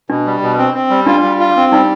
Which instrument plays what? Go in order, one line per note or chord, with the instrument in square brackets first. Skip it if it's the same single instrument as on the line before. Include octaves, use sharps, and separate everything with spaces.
[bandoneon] B2 [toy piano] D4
[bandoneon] G3
B2
C4
C4
G3
[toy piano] D4 [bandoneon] F4
[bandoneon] G3
F4
C4
[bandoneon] G3 [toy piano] D#4